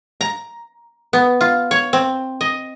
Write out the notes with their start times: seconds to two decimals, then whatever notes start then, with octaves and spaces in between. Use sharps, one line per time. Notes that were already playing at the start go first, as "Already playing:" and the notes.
0.21 A#5
1.13 B3
1.41 F4
1.71 C#5
1.93 C4
2.41 D#5